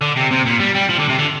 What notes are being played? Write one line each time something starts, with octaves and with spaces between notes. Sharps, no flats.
D3
C3
C3
A#2
G3
G3
F3
D3
C3
D3